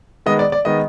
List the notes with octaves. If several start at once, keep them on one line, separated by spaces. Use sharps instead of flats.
D#3 G#3 B3 D#5
D5
D5
D#3 G#3 B3 D#5